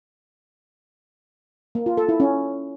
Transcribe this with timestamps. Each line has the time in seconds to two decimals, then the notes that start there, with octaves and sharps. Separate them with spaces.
1.75 A#3
1.86 F4
1.97 A4
2.09 E4
2.20 C#4